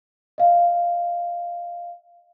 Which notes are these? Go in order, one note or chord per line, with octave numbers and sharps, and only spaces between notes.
D#5 F5